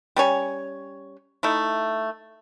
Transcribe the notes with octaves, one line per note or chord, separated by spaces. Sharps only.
G3 C#4 C#5 G#5
A3 D#4 E4